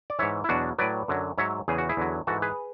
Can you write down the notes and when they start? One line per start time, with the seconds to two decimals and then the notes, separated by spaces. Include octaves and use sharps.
0.10 D5
0.19 G#2 E3 C#5 E5
0.44 E4
0.49 E2 B2 F#3 D4 F#4
0.79 A2 F#3 B4 D5
1.08 F#2 D3 F#3
1.38 G#2 F#3 C#5 E5
1.68 E2 C#3 E3 G#4
1.78 F#4
1.89 E4 G#4
1.97 E2 D3 F#3
2.27 G#2 E3 F#4 A4
2.42 G#4 B4